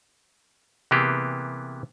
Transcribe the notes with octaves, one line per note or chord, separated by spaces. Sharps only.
C3 E3 A#3 B3 G4 G#4